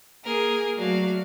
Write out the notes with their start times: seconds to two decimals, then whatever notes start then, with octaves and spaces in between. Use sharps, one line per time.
0.24 A#3 G#4 A#4
0.76 F#3 A3 F#4 D5 F5